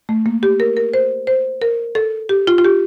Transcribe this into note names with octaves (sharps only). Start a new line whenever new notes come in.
A3
A#3
G4
A#4
A#4
C5
C5
A#4
A4
G4
F4
F4
G4